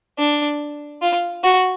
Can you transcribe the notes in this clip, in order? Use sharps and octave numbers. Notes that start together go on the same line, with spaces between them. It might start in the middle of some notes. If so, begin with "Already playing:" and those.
D4
F4
F#4